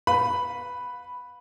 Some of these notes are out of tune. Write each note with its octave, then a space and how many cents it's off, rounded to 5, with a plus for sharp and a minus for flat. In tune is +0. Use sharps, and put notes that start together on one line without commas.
B4 +0 F5 +35 B5 +0